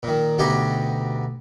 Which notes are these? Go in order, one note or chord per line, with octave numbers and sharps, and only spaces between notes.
A#2 D#3
D2 B2 D#4 G4 G#5